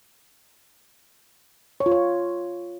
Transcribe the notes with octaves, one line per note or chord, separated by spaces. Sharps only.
C#5
F4
C#5